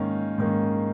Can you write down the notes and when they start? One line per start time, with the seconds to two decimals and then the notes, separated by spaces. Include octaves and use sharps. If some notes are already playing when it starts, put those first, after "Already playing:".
Already playing: G#2 D#3 A#3 C#4
0.38 G#2 D#3 A#3 C#4